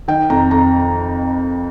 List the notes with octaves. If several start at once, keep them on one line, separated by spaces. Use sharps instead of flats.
D#3 G5
F2 A#5
F2 A#5